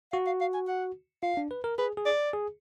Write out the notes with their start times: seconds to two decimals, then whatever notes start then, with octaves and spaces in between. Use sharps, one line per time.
0.12 F#4 F5
0.26 F5
0.41 F5
0.54 G#5
0.68 F#5
1.23 F4 F5
1.37 D4
1.51 B4
1.64 A#4
1.78 G#4 B4
1.97 G#4
2.06 D5
2.33 G#4